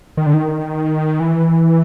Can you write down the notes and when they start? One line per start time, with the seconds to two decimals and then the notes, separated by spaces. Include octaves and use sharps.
0.17 D#3
0.26 D3
0.34 D#3
1.20 E3